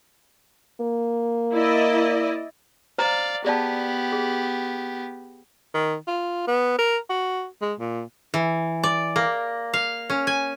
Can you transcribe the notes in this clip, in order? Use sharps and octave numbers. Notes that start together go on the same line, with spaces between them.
A#3
E4 D5 D#5
C5 D5 F5 A#5
B3 G4 G#4 D5 A5
G#4
D#3
F4
B3
A#4
F#4
G#3
A#2
E3
D5
A#3
F5
C#4
G#5